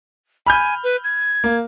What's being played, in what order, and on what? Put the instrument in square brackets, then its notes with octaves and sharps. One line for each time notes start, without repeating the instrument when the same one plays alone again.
[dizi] G#5 [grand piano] B5 F6 G6
[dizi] B4
G#6
[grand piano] A#3